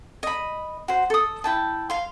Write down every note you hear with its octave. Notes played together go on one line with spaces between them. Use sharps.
D#5 B5
F#4 C5
A4 D#6
E4 G5 A5
F5 C6